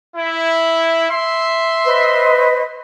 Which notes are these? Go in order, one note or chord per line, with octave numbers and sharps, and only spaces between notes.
E4
E5 C6
B4 C5 D#5